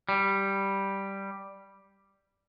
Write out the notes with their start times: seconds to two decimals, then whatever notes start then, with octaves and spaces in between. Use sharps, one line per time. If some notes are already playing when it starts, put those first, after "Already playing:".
0.09 G3